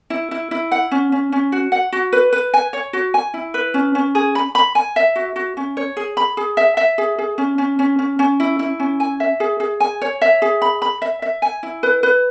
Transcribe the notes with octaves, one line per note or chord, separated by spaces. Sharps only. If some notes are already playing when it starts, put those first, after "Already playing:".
E4
E4
E4
F#5
C#4
C#4
C#4
F#4
F#5
F#4
B4
B4
G#5
C#5
F#4
G#5
E4
B4
C#4
C#4
G#4
B5
B5
G#5
E5
F#4
F#4
C#4
C#5
G#4
B5
G#4
E5
E5
G#4
G#4
C#4
C#4
C#4
C#4
C#4
E4
E4
C#4
G#5
E5
G#4
G#4
G#5
C#5
E5
G#4
B5
B5
E5
E5
G#5
E4
B4
B4